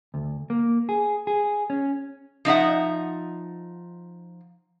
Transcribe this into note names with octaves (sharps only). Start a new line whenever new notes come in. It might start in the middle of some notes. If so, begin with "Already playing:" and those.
D2
A#3
G#4
G#4
C#4
F3 D#4 E5 F#5